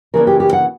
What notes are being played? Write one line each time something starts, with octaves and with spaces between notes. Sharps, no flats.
C#3 E3 G3 A#3 D4 A#4
G4
G4
F#5